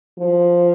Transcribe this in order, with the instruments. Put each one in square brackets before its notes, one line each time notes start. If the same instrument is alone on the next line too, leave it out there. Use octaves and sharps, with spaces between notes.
[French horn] F3